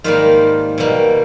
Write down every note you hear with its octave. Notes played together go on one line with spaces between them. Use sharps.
G#2 D#3 G3 A#3 F4
B2 G3 A#3